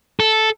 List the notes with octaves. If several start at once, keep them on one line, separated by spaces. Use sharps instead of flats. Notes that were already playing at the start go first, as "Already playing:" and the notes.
A4